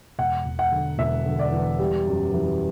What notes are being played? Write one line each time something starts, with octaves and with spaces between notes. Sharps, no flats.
E1 F#5
E1
F#5
D3
E1 E5
D3
D5
E2
G3
F#2
E3